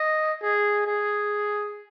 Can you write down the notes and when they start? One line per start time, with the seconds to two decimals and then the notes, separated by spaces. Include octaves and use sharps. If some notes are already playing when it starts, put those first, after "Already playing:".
Already playing: D#5
0.42 G#4
0.87 G#4